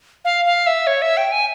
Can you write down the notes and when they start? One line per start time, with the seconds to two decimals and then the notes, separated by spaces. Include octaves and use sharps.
0.25 F5
0.46 F5
0.67 E5
0.87 C#5
1.02 E5
1.17 G5
1.32 G#5